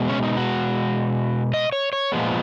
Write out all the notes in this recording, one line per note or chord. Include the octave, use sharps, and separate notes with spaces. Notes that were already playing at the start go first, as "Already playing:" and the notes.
Already playing: B2 G#3 B3
C#4
D#4
F#4
D#5
C#5
C#5
A#2 F3 G#3 B3